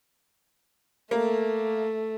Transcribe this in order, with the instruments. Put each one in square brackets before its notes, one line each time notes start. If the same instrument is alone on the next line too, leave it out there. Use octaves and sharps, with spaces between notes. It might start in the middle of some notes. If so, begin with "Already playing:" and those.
[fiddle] A3 [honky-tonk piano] A#3